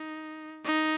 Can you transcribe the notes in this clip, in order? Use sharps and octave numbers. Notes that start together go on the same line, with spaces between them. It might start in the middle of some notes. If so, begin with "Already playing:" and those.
Already playing: D#4
D#4